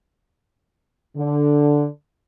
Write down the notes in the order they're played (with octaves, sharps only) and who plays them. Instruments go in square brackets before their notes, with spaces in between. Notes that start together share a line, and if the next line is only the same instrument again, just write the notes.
[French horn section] D3